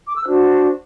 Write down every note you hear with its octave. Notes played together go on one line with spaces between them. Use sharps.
D6
E6
D4 F#4 C5 F#6